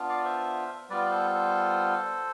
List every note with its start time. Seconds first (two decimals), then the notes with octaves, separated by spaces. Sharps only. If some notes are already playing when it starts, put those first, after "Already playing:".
Already playing: B3 D4 F4
0.09 D5 F5
0.25 C5 E5
0.90 G3 B3 F4 B4 D5
1.11 A4 C5
1.33 A4 C5